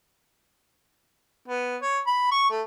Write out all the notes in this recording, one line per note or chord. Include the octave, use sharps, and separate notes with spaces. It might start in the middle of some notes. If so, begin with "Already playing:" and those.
B3
C#5
B5
C#6
A3